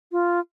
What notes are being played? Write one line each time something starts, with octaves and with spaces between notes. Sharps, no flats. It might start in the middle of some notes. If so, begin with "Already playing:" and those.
F4